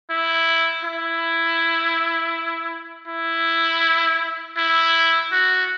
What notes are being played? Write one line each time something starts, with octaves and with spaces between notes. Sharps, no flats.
E4
E4
E4
E4
F#4